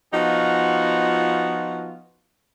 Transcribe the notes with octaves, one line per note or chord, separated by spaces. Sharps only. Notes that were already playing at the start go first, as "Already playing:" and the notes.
F3 B3 D#4 F4 F#4